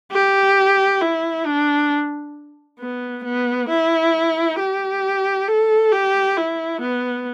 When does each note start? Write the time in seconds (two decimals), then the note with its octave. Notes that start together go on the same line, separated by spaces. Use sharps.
0.12 G4
1.01 E4
1.46 D4
2.80 B3
3.24 B3
3.69 E4
4.59 G4
5.48 A4
5.92 G4
6.37 E4
6.81 B3